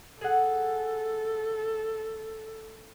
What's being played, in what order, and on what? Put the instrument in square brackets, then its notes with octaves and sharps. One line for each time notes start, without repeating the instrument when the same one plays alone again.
[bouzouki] G#4 F#5 [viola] A4